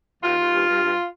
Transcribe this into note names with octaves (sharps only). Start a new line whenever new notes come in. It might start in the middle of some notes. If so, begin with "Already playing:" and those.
D#2 F4
D#2
G2
G2
G2